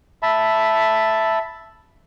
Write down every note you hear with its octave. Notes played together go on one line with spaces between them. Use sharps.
E5 A5 B5